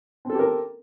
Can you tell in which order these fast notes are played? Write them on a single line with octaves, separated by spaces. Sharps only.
C4 A4 G4 A#4